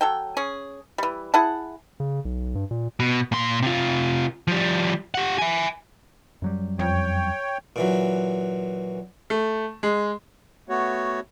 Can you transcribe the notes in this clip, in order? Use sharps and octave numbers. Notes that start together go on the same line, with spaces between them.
F#3 A4 G5
C#4 G#4
E3 G3
E4 G#4 F#5 A5
C#3
B1
G2
A#2
B2
A#2 C6
C3 F4
F3 G3
G4 F#5
E5 G#5
F#2 F#3 G3
F2 C#5 G5
A#2 E3 F#3
A3
G#3
A3 B3 F#4 C#5